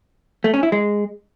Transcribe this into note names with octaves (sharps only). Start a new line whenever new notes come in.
A3
C#4
E4
G#3